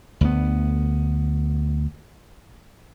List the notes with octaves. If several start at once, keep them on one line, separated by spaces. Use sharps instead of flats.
D2 B3